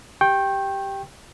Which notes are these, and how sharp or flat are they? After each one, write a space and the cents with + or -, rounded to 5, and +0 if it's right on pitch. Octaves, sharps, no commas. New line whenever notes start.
G4 +0 G5 +0 C#6 -35